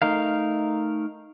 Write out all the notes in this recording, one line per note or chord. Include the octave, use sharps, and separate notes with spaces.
A3 D#4 A#4 F5